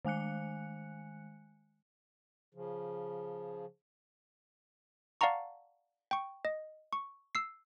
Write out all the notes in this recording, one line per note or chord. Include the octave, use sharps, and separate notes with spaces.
D#3 G#3 G#5 F#6 C#7
C#3 F3
D5 F5 F#5 A5 A#5 C#6
G5 C#6
D#5
C#6
E6 C7